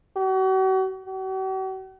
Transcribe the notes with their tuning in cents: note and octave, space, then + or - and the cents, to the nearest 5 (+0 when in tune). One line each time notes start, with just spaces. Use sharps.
F#4 +40
F#4 +45